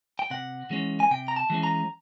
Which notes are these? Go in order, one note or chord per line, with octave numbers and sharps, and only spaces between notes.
G5
C3 F#5
E3 G#3 C#4
G#5
C3 G5
A#5
A5
E3 G#3 C#4
A#5